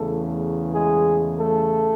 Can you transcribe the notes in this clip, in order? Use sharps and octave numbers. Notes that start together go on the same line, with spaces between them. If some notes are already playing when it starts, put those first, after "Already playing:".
Already playing: E2 C#3 E3 A3 A4
G#3 G#4
A3 A4